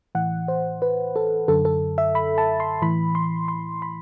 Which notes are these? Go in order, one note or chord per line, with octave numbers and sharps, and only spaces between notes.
A2 E3 F#5
C5
B4
A4
F#2 D3 A4
A4
E5
B5
A5
C6
A2 E3 B5
C6
C6
B5